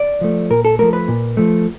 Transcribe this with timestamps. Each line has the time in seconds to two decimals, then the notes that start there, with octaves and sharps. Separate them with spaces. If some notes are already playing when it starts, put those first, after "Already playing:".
Already playing: D5
0.21 F3 A3
0.50 A#2 A#4
0.65 A4
0.79 F3 A3 A#4
0.93 B4
1.08 A#2
1.37 F3 A3